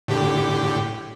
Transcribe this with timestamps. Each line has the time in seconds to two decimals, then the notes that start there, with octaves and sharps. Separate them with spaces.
0.08 A2 D3 G4